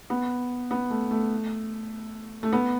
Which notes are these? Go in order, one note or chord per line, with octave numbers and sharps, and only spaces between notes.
B3
B3
A3
A3
A3
B3